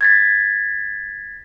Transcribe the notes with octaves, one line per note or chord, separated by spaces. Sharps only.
G#6 A6 B6